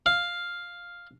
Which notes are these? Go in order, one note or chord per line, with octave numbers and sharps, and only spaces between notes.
F5